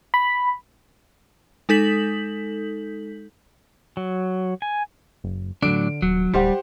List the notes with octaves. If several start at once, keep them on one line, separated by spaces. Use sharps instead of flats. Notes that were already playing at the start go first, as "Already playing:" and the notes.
B5
G#3 D#4 A4 G6 B6 F#7
F#3
G#5
F#1
A2 D3 F#3 D4 D7
D#1 F#3
D1 G3 G4 C5 F#5